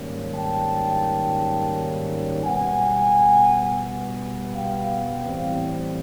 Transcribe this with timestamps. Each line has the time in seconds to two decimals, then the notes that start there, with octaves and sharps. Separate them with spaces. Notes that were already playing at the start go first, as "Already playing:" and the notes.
Already playing: G#2 D#3 G3 A#3 C#4
0.35 G5 A5
2.45 B2 G3 B3 F#5 G#5
4.55 F5 G5
5.25 A2 E3 G3 C4